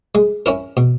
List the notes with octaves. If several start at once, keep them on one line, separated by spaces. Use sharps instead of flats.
G#3
C#4 E4 A#4
B2